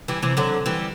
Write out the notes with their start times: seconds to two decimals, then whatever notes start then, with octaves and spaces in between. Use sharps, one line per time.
0.08 E3 G3
0.22 C3 E3
0.37 D3 F#3
0.66 E3 G3